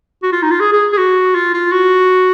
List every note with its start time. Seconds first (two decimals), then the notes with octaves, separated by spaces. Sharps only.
0.23 F#4
0.32 F4
0.42 D#4
0.51 F4
0.60 G#4
0.72 G#4
0.92 G#4
0.98 F#4
1.35 F4
1.53 F4
1.72 F#4